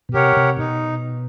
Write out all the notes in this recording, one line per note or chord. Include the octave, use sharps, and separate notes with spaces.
B2
C3 G4 A#4 C#5 F#5
C3
B2 D#4